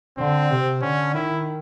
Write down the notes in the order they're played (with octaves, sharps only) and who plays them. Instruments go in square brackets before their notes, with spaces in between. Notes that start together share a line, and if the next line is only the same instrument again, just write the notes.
[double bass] D3 [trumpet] C4
[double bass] C3
[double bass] D3 [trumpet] C#4
[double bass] D#3 [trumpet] E4